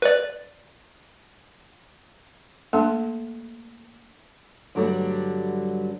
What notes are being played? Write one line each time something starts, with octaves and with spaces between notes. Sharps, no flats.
B4 D5
A3 A#3 D4 A4 A5 C6
G2 D3 F#3 G3 A3